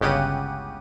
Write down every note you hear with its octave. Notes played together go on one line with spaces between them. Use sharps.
G1 C#2 C#3 G4 F#5 D#7